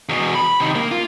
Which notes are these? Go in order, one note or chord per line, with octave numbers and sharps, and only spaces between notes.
E2 B2
B5
C3 D#3
A#3
F4